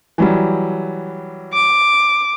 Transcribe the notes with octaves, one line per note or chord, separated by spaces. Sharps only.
E3 F#3 G3
D6